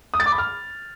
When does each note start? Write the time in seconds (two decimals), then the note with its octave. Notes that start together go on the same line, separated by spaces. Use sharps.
0.14 D#6
0.20 A6
0.26 D6
0.32 B5
0.38 F6